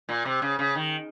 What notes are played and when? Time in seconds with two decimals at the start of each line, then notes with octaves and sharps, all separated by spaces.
0.09 A#2
0.25 C3
0.42 C#3
0.59 C#3
0.75 D#3